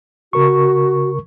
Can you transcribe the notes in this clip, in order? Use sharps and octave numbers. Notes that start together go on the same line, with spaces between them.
C#3 F#4 A#4 C#6